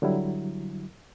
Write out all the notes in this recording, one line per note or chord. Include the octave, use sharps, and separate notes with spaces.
D3 F#3 G3 E4